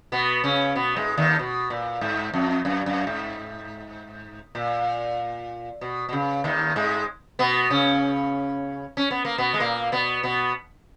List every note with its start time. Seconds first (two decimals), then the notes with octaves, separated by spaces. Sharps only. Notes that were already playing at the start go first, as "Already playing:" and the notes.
0.12 B2 B3
0.44 C#3 C#4
0.75 B2 B3
0.96 G#2 G#3
1.17 D#2 D#3
1.39 B2
1.70 A#2
2.01 G#2
2.34 F2
2.65 F#2
2.86 F#2
3.07 G#2
4.55 A#2
5.81 B2
6.09 B2
6.12 C#3
6.44 D#2 D#3
6.76 G#2 G#3
7.39 B2 B3
7.70 C#3 C#4
8.97 C#4
9.11 B3
9.25 A#3
9.38 B2 B3
9.54 G#3
9.60 A#2 A#3
9.92 B2 B3
10.23 B2 B3